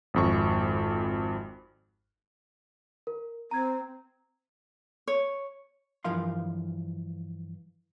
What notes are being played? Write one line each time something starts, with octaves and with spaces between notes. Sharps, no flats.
G#1 F2 C#6
A#4
C4 A#5 G#6
C#5
G2 E3 F3 A#4 F5 C6